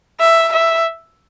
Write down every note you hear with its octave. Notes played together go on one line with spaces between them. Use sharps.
E5
E5